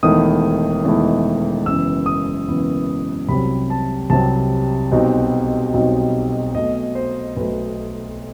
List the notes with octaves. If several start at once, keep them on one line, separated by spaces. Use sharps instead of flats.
E1 E2 D#3 A3 E4 D#6
E1 E2 D#3 A3 E4
F#1 F#2 E3 B3 E6
D#6
F#1 F#2 E3 B3
C2 C3 F#3 B5
A5
C2 C3 F#3 A5
B1 B2 G3 C4 D#4
B1 B2 G3 C4 D#4
B1 B2 A3 D#5
C5
B1 B2 A3 B4